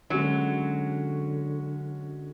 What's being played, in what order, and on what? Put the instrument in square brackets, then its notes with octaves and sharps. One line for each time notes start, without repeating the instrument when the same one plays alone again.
[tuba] D3 [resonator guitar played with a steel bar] F#3 [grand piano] G#3 C#4 F#4